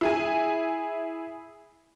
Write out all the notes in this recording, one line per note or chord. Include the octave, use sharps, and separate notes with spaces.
E4 G#4 G#5